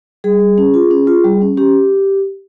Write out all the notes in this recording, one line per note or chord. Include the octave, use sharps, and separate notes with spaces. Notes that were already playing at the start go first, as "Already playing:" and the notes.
G3 G#4
G3
C#4
F4
C#4
F4
G3
C#4
C#4 G4